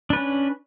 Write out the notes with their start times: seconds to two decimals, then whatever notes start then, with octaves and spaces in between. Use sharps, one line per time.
0.10 D4
0.13 B4
0.16 C#4